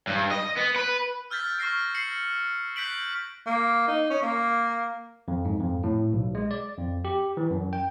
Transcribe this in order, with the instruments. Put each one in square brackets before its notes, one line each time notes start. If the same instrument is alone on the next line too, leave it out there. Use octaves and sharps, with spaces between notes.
[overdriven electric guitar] G2
D#5
B3
B4
[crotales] E6 F6 G6 A6 B6
C#6 F6 A#6 C7 D7
A#6 C7 C#7 F#7
F#6 G6 B6 D7 F#7
[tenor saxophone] A#3
D#4
C#4
A#3
[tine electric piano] F2
G#2
F2
A2
B1
G#3
D5
F2
G4
E3
F#2
G5